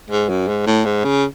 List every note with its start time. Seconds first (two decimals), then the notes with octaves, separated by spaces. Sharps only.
0.10 G#2
0.29 F#2
0.48 G#2
0.67 A2
0.86 G#2
1.05 C#3